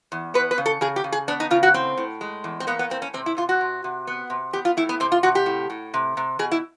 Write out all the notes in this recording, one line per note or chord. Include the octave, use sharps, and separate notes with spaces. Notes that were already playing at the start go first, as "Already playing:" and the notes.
E2
B3 B4
B4
C#3
A4
C#3 G#4
G4
C#3
G#4
B3 D4
D#4
C#3 F4
F#4
A2 C4
A2
G#3
E2
C4
A#3 B3
B3
A2 C4
C#4
C3 C4
E4
C3 F4
F#4
C3
C3
B3
C3
B3 G4
F4
A2 E4
B3
C3 C4
F4
C3 F#4
G4
A2
A2
C3
C3
B2 G#4
E4